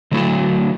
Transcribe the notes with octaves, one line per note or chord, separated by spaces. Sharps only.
D3 F#3 A3 E4 A4